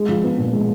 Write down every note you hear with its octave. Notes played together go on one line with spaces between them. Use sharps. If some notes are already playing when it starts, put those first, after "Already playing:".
Already playing: G#3
F3
B3
A#2
G#3